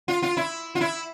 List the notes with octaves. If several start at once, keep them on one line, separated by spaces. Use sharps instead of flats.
F4
F4
E4
F4
E4